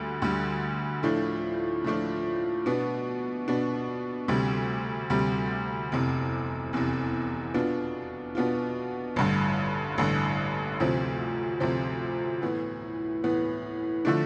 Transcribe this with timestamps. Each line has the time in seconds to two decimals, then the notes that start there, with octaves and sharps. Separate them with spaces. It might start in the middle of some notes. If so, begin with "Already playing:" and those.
Already playing: D2 D3 G3
0.22 D2 D3 G3
1.03 A2 F3 A3 D4 F4
1.84 A2 F3 A3 D4 F4
2.66 B2 B3 D4
3.48 B2 B3 D4
4.28 D2 C3 G3
5.10 D2 C3 G3
5.92 F1 E2 C3
6.73 F1 E2 C3
7.54 B2 B3 D4 F4
8.35 B2 B3 D4 F4
9.16 A1 G2 D3
9.98 A1 G2 D3
10.80 D2 C3 F3 C4
11.60 D2 C3 F3 C4
12.42 A2 E3 B3
13.24 A2 E3 B3
14.05 D3 F3 A3 D4